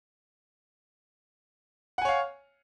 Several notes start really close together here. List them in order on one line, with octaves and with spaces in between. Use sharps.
F#5 G#5 C#5 F5